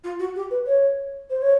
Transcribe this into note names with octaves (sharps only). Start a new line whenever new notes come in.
F4
F#4
G4
B4
C#5
C5
C#5